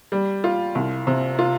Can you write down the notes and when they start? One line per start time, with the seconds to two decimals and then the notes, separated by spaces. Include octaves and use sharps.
0.12 G3
0.44 F4
0.75 C2
1.07 C3
1.39 F4